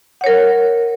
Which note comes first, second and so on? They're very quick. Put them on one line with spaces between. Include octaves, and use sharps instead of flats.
F#5 C#5 A#4